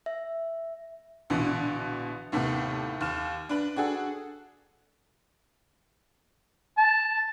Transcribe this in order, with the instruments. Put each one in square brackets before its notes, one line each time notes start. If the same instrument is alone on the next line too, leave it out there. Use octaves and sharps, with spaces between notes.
[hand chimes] E5
[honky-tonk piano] A#1 B2 D3 E3
D#2 A2 C3 D#3 A3 B3
D#2 F6 E7
D4 B4 F#7
D4 F#4 G#4 A4
[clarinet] A5